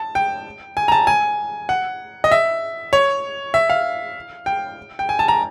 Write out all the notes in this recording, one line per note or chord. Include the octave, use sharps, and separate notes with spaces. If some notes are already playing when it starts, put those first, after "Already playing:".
Already playing: A5
G5
G#5
A#5
A5
G#5
F#5
D#5
E5
C#5
E5
F5
G5
G5
G#5
A5
A#5